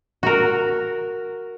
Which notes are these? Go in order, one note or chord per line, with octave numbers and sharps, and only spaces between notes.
F#4 A#4